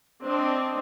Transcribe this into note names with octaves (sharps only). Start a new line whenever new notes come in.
C4 D4 D#5